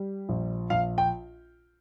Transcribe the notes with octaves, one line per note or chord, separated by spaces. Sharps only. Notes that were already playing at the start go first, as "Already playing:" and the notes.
Already playing: G3
A#1
A#1 F5
G5